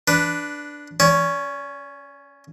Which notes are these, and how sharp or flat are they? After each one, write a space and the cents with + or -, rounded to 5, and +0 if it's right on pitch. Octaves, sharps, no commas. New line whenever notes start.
D4 +0 B4 +0
C#4 +0 D5 -45